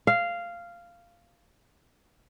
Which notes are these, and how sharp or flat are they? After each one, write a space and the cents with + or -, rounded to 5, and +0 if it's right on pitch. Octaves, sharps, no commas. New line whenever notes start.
F5 -10